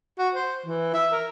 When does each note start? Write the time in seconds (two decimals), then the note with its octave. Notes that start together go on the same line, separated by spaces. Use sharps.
0.19 F#4
0.35 C5
0.66 E3
0.94 E5
1.12 A#4